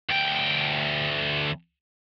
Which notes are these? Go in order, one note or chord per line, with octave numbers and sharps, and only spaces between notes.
D2 G5